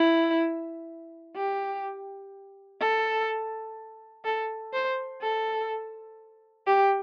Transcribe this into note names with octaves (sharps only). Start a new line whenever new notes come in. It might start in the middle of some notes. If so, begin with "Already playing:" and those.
Already playing: E4
G4
A4
A4
C5
A4
G4